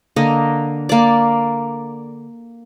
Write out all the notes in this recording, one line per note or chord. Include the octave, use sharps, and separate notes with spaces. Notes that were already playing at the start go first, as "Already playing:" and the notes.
D3 A#3 D#5
A#3 D5